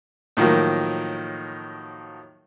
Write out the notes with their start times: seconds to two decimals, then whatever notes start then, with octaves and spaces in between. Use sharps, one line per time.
0.37 A2 D#3 F3 F#3 A#3